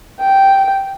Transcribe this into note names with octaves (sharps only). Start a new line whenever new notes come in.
G5